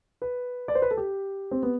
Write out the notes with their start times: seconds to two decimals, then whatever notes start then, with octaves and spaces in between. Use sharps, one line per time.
0.22 B4
0.68 D5
0.75 C5
0.82 B4
0.91 A4
0.97 G4
1.51 C4
1.63 B3